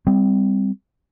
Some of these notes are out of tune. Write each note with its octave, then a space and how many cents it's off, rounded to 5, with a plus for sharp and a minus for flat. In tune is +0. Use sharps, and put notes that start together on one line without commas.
G3 +15 C4 -10